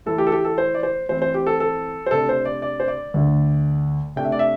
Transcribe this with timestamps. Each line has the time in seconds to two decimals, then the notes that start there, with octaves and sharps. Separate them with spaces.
0.06 A2 E3 A3 A4
0.18 G4
0.27 A4
0.32 G4
0.44 A4
0.58 C5
0.74 D5
0.83 C5
1.09 A2 E3 C4 C5
1.22 C5
1.34 G4
1.47 A4
1.60 A4
2.06 C5
2.11 C3 A3 D4 A4
2.29 C5
2.45 D5
2.62 D5
2.80 C5
2.88 D5
3.14 D2 D3 A3
4.16 C3 A3 D4 G5
4.24 E5
4.32 D5
4.39 E5